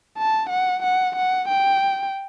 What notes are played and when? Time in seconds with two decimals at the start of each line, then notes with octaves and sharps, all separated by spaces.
0.18 A5
0.50 F#5
0.83 F#5
1.16 F#5
1.49 G5